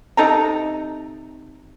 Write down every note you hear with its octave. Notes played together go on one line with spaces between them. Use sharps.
C3 D#4 A4 A#5